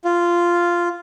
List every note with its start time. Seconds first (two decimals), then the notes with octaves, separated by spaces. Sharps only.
0.05 F4